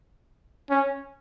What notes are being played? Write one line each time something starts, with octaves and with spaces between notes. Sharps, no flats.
C#4